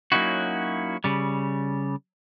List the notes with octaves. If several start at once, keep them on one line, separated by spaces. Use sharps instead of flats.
F#3 A#3 C#4 D#4 E4 F#4
C#3 G3